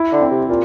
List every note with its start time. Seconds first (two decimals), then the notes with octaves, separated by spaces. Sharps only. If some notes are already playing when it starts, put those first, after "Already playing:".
Already playing: E4
0.12 D3
0.21 C4
0.31 C3
0.49 A#2 F4